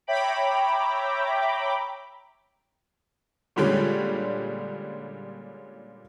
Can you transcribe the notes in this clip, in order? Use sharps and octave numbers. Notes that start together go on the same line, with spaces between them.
C#5 E5 G5 A#5 B5 D6
A#2 D3 G3 G#3 C#4